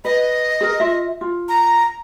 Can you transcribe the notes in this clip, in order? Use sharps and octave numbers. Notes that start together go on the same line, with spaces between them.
B4 D#5
G#4 A#4
F4 E5
F4
A#5